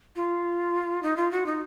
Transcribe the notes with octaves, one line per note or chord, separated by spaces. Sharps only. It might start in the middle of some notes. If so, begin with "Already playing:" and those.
F4
D#4
F4
F#4
D#4